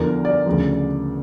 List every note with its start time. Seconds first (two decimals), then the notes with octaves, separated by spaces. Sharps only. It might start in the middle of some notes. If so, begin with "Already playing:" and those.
Already playing: E2 D3 F3 A#4
0.25 D5
0.46 D2 C#3 F3